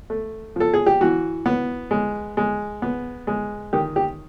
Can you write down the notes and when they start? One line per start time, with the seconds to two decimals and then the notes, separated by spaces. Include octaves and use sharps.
0.10 A3
0.56 F3 A4
0.74 G#4
0.86 G4
1.01 E3 F#4
1.46 B3
1.91 G#3
2.37 G#3
2.82 B3
3.27 G#3
3.73 D#3 G4
3.96 G4